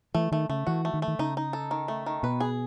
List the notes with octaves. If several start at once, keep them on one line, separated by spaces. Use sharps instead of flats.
E3 A3
D#3 A3
C#3 A3
E3 F#4
A3
D#3
A3
D#3
C#3 D#4
D#4
A4
D#3
A3
D#3
B2 B4
G#4